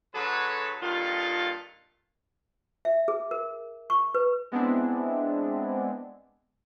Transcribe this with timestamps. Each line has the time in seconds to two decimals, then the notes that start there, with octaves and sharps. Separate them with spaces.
0.14 D3 F#3 G#4 A4 B4 C#5
0.81 G2 A#2 D#3 F4 A4 F5
2.85 E5
3.08 G#4
3.31 A#4
3.90 C#6
4.14 B4
4.52 G#3 B3 C4 D4 E4